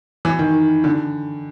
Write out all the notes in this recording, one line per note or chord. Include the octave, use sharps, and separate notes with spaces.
E3
D#3
D3